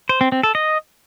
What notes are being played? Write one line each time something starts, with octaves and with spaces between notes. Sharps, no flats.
C5
C4
C4
A4
D#5